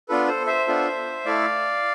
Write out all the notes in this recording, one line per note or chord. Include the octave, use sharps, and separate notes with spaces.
B3 D4 F4 A4 B4
A4 C5
C5 E5
B3 D4 F4 A4
A3 E4 A4 D5 F5